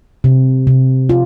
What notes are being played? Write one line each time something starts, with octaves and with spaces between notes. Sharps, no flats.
C3
C3
F4